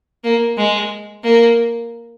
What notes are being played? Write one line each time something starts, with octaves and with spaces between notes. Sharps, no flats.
A#3
G#3
A#3